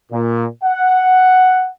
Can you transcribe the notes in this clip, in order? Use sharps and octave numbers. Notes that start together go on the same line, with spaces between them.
A#2
F#5